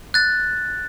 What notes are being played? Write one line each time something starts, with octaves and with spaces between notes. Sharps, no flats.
F#6 A6